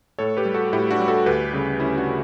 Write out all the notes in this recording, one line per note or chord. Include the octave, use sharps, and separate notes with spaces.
A2 A4 C#5
G4 B4
G3
F#4 A4
A2 E4 G4
D4 F#4
G3
F#4 A4
D2 G4 B4
C#3 G3
D2 C#4 E4
D4 F#4
C#3